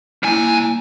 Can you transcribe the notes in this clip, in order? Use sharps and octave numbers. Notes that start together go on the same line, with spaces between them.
C2 A#3 E4 G#5